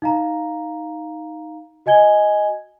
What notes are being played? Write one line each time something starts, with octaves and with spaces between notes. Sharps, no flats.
D#4 F5 A#5
F#4 D#5 G#5 G#6 G7